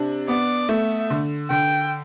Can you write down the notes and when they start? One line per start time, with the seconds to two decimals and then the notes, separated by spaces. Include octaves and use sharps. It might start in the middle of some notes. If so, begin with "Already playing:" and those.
Already playing: C3 D4
0.28 B3 D5
0.69 A3 E5
1.10 D3
1.50 D3 G5